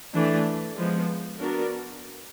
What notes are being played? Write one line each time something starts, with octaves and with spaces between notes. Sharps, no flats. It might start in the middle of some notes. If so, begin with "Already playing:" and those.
E3 A3 D4
F3 G#3 B3
B3 D4 F#4 A#4